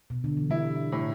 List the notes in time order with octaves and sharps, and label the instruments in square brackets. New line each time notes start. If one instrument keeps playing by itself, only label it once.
[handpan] B2
D3
E3
[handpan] G3 [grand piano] E4
[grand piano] A2